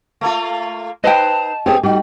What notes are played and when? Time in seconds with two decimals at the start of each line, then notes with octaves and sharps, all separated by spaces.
0.21 A3 A#3 F4
1.04 D#4 B4 C5 D#5 G5 A5
1.66 B3 G4 G#4
1.83 G3 D#4 F#4